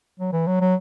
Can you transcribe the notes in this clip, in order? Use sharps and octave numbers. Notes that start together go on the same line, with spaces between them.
F#3
E3
F#3
F#3